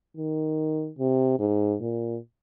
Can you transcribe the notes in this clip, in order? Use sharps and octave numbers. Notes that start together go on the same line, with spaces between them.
D#3
C3
G#2
A#2